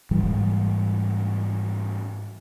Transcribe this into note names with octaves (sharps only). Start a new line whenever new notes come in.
G#2 E3 G3 G#3